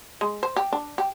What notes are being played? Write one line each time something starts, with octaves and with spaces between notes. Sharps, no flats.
G#3
C5
G4
D4
G4